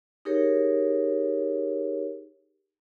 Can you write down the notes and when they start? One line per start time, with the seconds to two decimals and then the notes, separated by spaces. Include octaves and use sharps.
0.25 D#4 G4 G#4 A#4 C#5